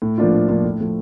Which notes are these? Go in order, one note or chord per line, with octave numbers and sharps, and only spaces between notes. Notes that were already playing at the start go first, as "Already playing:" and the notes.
A2
F3 A#3 D4 F4
A2
F3 A#3 D4 F4
A2
F3 A3